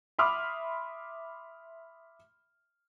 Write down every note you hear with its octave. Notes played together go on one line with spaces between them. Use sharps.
E5 B5 C6 D6 D#6 F6